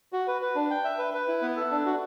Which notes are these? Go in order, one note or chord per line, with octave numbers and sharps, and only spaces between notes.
F#4
B4
B4
D4
G5
E5
B4
B4
E4
B3
A4
D4
F#4